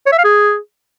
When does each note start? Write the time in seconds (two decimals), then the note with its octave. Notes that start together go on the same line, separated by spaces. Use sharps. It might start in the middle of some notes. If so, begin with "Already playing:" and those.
0.07 C#5
0.12 E5
0.18 F5
0.24 G#4